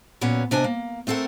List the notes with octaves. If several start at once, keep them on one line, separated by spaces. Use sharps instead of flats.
A#2 F#3 B3 C#4
C3 D4 D#5 G#5
A#3
A3 C4 A4 A#4 F#5